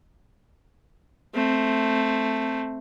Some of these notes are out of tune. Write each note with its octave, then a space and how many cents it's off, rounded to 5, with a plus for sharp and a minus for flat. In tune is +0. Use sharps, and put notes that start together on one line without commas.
A3 +0 C4 +0